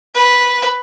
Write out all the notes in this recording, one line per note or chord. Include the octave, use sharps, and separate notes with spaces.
B4